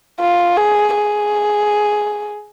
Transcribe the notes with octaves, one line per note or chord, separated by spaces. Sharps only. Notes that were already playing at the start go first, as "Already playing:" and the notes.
F4
G#4
G#4